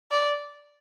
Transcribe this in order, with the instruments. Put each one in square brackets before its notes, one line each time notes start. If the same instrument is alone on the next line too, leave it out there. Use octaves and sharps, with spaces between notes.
[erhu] D5